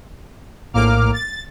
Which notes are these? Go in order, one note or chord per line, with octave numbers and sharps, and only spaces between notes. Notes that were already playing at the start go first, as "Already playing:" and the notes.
A#1 A2 A#3 D6 F6
A6